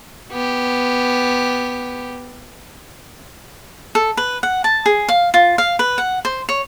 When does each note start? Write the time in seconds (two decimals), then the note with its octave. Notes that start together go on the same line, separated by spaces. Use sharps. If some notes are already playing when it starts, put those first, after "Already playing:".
0.32 B3 G4
3.95 A4
4.17 B4
4.43 F#5
4.64 A5
4.86 G#4
5.09 F5
5.34 F4
5.58 F5
5.79 B4
5.98 F#5
6.25 C5
6.49 C#5